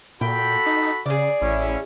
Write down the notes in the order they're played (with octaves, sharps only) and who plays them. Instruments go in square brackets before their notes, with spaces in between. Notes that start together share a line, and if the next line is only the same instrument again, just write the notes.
[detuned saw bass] A#2 [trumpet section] F#4 A4 B5 [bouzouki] G5
[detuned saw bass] D#4
[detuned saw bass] C#3 [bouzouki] G#4 D5
[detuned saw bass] A1 [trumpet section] C#4 E4